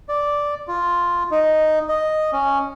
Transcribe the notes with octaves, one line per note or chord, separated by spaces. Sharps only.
D5
F4
D#4
D#5
C#4